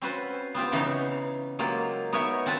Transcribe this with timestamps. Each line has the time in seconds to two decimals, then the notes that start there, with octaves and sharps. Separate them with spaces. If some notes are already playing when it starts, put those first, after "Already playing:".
0.02 C4 C#4 F4 F#4 B4 C5
0.55 B3 C4 F4 G4
0.72 C#3 E3 B3 D#4 C#5 F5
1.59 F#3 G#3 A#3 F4 G4
2.13 B3 D#4 A#4 C#5 E5 G#5
2.46 C4 F4 A4 B4